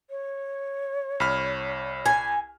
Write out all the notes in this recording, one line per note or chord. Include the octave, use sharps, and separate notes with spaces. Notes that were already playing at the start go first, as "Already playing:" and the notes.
C#5
C2 B5 F6
G#5